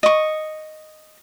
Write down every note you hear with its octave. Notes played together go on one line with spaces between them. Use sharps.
D#5 C#6